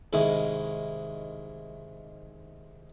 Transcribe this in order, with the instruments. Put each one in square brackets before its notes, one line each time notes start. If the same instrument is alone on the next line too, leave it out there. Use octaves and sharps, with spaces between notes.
[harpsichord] C2 G#2 D#3 G#3 E4